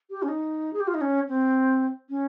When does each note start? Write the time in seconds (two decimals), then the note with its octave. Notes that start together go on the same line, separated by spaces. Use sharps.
0.10 G4
0.23 C#4
0.28 D#4
0.73 G#4
0.80 G4
0.87 F4
0.94 D#4
1.01 C#4
1.29 C4
2.10 C#4